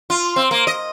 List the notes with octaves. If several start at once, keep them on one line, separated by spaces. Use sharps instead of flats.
F4
C4
A#3
D#5